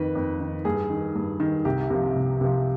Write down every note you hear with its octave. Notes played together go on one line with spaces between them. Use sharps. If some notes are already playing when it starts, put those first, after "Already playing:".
Already playing: F2 D#3 B4
F2
D#3
G2 G#4
D#3
G2
D#3
C2 G4
C3 F3
C2
C3 F3